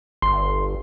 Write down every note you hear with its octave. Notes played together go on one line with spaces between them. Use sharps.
G1 C6